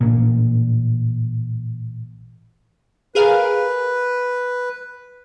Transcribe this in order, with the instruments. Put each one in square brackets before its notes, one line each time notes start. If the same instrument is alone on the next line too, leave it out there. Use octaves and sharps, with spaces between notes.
[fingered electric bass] A1 A#2
[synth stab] G#4 A#4 F5 [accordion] B4